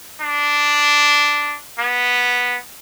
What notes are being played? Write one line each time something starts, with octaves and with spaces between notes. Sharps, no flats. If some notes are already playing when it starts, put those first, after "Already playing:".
D4
B3